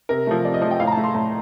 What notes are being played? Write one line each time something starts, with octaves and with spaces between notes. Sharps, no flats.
C3 A#4
F3 A3
C3 D5
D#5
F3 A3
G5
A2 F5
A#5
A5
A3
C6
A2 A5